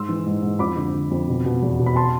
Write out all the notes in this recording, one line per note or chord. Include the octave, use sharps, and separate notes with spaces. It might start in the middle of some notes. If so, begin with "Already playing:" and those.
Already playing: G#2 C6 E6
E3
G#2
G#2
F2 B5 D6
D3
D3
F2
B2
B2
E2
B2
B5
A5 C6